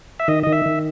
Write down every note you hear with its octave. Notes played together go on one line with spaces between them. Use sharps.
E5
D#3 D#5
D#3 D#5
E5
D#3